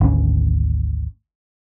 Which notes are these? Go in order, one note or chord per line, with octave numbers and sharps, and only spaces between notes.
G#1 D2 C#3 C#4